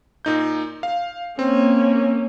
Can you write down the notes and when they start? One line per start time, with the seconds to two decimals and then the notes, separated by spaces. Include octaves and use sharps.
0.25 A#2 D#4 G6
0.83 F5
1.39 A#3 C4 C#4